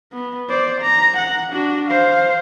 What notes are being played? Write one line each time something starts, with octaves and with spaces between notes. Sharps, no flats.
B3
C5 D5
A#5
F#5
D4 F#4
C5 F5